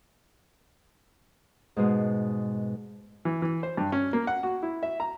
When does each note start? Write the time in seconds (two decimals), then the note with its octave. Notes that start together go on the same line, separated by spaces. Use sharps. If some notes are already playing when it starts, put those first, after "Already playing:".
1.76 G#2 B2 G#3
3.25 E3
3.42 E3
3.63 C5
3.77 G2
3.92 C#4
4.13 A#3
4.27 F#5
4.43 F#4
4.63 E4
4.83 E5
5.00 A#5